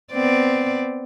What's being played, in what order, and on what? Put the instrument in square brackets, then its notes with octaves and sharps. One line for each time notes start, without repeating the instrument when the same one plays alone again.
[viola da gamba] B3 C4 D5